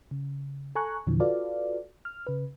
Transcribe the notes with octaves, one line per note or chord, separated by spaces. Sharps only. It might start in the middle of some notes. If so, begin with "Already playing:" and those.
C#3
A4 G#5 A#5 C#6 F#6
E2 A#2 D3 E3 F3
F4 F#4 A4 B4 D5 F5
F6
C#3 B4